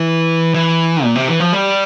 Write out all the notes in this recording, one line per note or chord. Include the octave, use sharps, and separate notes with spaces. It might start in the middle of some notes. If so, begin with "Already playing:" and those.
Already playing: E3
E3
A#2
C3
E3
F3
G3